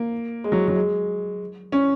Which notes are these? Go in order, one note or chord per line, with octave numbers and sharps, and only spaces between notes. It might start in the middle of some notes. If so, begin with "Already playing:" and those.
Already playing: A#3
G#3
F#3
F#3
G#3
C#4